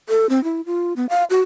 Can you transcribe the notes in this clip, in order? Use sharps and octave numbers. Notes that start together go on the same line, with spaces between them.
A4
C4
E4
F4
B3
F5
F#4